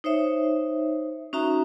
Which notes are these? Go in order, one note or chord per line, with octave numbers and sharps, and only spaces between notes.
D#4 C5 C#5 E5
C#4 D#4 F#4 E5 A#5